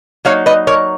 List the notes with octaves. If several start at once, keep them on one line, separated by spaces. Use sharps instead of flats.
F#3 A#3 D#4 C#5 F5
B4 D#5
A#4 C#5